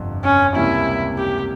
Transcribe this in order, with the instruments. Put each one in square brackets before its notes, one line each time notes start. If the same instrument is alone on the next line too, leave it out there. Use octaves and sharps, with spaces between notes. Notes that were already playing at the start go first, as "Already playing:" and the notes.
Already playing: [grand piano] G1 F2 C3 F3
[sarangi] C#4
[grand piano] C#2 C3 G3 A#3 [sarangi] E4
[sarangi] G4